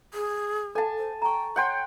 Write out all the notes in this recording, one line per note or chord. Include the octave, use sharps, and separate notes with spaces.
G#4
A4 F#5 G#5 A5
C5
G5 A#5 C#6
C#5 F#5 G5 C6